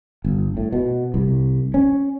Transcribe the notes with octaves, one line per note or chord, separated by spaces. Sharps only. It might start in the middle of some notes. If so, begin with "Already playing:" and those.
G1
A2
B2
C2
C#4